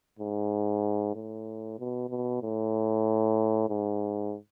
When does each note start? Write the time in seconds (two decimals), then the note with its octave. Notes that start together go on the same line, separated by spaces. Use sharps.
0.19 G#2
1.15 A2
1.79 B2
2.09 B2
2.42 A2
3.69 G#2